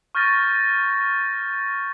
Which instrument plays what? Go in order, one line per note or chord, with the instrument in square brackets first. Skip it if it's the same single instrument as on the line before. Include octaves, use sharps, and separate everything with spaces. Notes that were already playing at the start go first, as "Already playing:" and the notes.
[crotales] C#6 F6 G6 A6 A#6 D#7